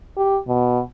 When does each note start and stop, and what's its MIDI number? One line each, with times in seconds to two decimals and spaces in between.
0.17 0.38 67
0.47 0.80 47